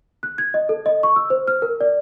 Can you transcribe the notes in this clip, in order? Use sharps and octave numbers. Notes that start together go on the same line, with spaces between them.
F#6
G#6
D#5
A4
D#5
C#6
E6
C5
F6
A#4
D5